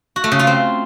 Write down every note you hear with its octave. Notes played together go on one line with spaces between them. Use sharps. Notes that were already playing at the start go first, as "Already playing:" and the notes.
F#4
A3
C#3
F4
C4